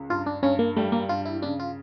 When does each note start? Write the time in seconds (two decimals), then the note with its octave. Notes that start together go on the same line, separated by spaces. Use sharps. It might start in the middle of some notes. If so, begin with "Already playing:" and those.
Already playing: C#2 C#3
0.10 G2 F4
0.26 D4
0.43 G2 C#4
0.59 A#3
0.77 G3 A3
0.92 A#3
1.09 G2 F4
1.25 E4
1.42 C#3 D4
1.60 F4